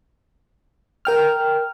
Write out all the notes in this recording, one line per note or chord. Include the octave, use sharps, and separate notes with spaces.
A#4 G5 F6